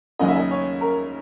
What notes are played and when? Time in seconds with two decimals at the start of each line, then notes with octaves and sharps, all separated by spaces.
0.19 D#2 C#3 F#3 C#4 D#5
0.28 E5
0.36 D#5
0.51 C#5
0.81 A#4